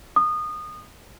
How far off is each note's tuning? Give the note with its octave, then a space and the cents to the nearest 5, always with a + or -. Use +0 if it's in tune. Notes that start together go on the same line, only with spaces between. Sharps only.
D#6 -25